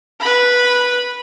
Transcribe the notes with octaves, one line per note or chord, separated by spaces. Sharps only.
B4 B5